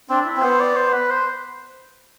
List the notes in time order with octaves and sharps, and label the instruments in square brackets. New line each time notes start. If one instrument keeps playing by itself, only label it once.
[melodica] C4 [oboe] D4
[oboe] E4
[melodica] C4
[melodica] B3 [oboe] C5
[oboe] D5
C5
B4
C5